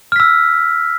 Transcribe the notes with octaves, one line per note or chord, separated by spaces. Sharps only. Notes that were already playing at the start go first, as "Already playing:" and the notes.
E6 F6 B6